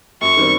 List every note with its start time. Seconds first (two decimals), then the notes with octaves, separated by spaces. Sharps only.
0.21 F#2 C#6
0.37 D#3 G3 C4